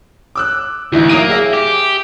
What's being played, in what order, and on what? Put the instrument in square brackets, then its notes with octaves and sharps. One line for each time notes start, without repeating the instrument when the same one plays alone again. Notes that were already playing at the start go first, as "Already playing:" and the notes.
[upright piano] D6 E6 F#6
[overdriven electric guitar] D2 [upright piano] E3 D#4 E4
[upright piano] F#3 D#6 D#7 [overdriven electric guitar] A#3
[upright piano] G#4 E5
[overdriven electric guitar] G4